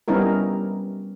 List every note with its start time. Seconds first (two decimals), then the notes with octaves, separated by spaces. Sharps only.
0.08 G3 B3 C#4 D#4 E4 A#4